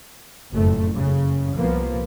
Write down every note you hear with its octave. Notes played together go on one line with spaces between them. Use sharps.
F#1 F2 A2 A3
F#1 C#3
C2 F3 A#3 B3